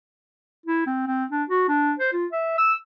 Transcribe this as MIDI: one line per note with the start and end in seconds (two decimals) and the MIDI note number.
0.66 0.82 64
0.87 1.07 60
1.07 1.25 60
1.31 1.43 62
1.50 1.66 66
1.69 1.94 62
1.99 2.13 72
2.13 2.26 65
2.32 2.56 76
2.58 2.74 88